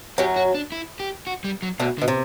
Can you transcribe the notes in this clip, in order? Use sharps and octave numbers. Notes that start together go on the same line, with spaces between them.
F#2 F#3 G4
F#4
D4
E4
G4
F#4
G3
F#3
D2 B2 D3
D3
B2
C3